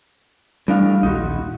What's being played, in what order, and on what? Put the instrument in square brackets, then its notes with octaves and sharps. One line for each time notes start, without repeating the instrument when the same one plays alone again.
[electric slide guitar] A2 D4 F5 [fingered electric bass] G3
[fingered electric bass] A#1 D#2 [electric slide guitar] D#4 F#4